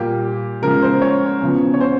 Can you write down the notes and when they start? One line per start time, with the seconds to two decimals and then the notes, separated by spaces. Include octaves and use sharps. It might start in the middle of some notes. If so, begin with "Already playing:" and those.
Already playing: A#2 G3 A#3 G4
0.62 C#3 F3 G#3 A#4
0.82 C5
1.02 C#5
1.42 E2 C#3 F3
1.74 C#5
1.80 C5